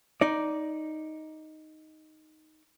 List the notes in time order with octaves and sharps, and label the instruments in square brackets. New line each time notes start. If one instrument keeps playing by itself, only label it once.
[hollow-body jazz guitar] D#4 D5